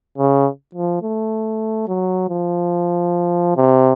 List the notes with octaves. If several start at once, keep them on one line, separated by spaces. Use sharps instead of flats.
C#3
F3
A3
F#3
F3
C3